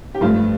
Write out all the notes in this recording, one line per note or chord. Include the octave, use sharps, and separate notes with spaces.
G4
G2 F3 A3 F4